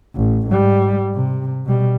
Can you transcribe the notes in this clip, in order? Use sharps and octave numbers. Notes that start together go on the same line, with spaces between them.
A1
G#2 G3
C3
B2 G3